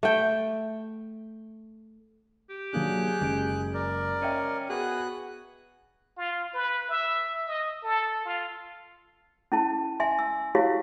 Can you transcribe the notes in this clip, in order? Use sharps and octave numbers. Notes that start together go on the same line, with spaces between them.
A3 G5
G4
F#3 A#3 D4 G#4 F#6
F#1 G#3 D7
A#4 D5
C#4 D#5 E5 G5
B3 F#4 G#4 F#6
F4
B4
E5
D#5
A4
F4
C#4 E4 A5
E5 G#5 C6
E6
E4 F#4 G4 C#5 F5